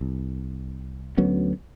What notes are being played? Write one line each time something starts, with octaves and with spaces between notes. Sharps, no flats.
C2
D2 F#3 B3 C#4